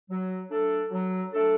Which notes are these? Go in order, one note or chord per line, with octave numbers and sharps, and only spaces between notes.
F#3
A3 D4 A4
F#3
A3 D4 A4